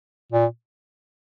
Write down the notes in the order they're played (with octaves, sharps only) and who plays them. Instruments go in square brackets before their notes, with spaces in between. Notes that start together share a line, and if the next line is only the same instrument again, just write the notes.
[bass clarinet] A#2